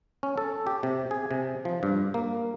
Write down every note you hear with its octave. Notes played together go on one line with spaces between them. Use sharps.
C#4
A4
G4
C3
G#4
C3
F3
G2
A#3